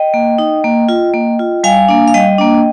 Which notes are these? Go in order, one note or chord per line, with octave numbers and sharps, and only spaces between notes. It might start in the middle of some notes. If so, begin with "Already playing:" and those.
Already playing: D#5 G5
A#3
D#4
A#3
F4
A#3
F4
G3 F5 G#5
A#3 D4
F5
G3 D#5 G5
A#3 D4